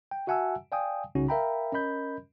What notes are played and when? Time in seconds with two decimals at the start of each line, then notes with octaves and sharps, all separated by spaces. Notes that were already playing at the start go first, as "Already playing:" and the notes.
0.11 G5
0.27 F#4 E5 F#5 G#5 A5 E6
0.72 D5 F5 G5 G#5 D#6
1.15 C2 C#3 C#4 D#4 F#4
1.28 A#4 E5 F5 G5 A#5 B5
1.72 C#4 A#4 D#5 B5 G6